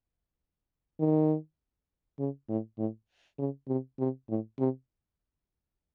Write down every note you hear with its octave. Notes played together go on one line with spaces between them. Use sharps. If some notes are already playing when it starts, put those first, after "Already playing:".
D#3
C#3
A2
A2
C#3
C3
C3
A2
C3